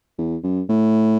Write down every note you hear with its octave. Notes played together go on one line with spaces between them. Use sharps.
E2
F#2
A2